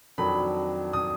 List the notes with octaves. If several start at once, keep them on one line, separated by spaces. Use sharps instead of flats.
F2 D#3 F#3 D4 B5
D#6